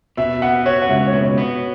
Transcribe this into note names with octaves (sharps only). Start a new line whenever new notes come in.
B2 E5
B3 F#5
F#4 C#5
F#5
C#2 E5
C#5
B2
C#5
B3